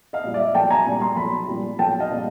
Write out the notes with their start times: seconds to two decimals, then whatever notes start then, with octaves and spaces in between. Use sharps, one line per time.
0.13 D#5 F5
0.24 A#2 G3
0.34 D5 E5
0.55 B1 G5 A5
0.70 G#5 A#5
0.86 A#2 G3
1.02 A#5 C6
1.17 B1 A5 B5
1.48 A#2 G3
1.79 B1 G5 A5
2.00 D#5 F5
2.11 A#2 G3